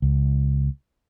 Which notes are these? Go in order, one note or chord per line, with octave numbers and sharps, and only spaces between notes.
C#2